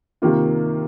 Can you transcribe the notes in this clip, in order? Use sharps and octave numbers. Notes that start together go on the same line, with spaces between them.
C3 D#3 A#3 F4